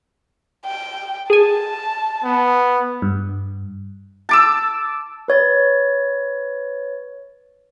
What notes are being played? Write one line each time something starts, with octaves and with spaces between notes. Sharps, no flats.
G5
G#4 G#5 A5
B3
G2
A5 D6 E6
B4 C#5 A6